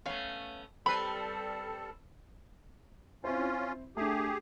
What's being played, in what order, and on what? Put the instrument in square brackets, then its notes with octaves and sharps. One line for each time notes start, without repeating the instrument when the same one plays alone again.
[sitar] A3 B3 C#4 [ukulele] C#5 F5
[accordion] G3 A4 [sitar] C4 B4 [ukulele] B5
[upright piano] C4 E4 C5 [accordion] C#4 F4
[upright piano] A3 D4 [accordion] G4 G#4